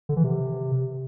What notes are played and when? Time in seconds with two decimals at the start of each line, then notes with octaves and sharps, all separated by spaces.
0.09 D3
0.16 E3
0.24 C3